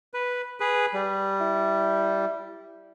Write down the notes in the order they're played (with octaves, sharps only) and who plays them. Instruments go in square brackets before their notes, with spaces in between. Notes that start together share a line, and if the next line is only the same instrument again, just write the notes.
[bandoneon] B4
G#4 B4
G3
[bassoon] E4